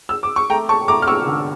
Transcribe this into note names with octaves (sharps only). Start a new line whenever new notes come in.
E6
D6
C#6
A3 G5 A#5
A5 C#6
A3 A#5 D6
F6
C#6 E6
D3